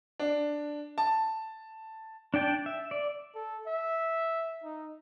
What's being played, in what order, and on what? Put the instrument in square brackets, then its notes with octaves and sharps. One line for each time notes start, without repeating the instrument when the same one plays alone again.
[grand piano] D4
A5
[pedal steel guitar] D4 D5 G5 A5
E5
D5
[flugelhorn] A4
E5
D#4